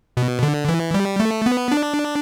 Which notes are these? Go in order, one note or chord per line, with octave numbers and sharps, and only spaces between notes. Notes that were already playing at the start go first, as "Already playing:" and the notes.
B2
D3
E3
G3
A3
B3
D4